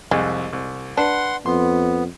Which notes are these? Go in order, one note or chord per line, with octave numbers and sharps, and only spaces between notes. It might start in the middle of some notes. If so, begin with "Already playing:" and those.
C2 F2 G#3
C2
D4 B4 F#5 C6
F2 B3 C6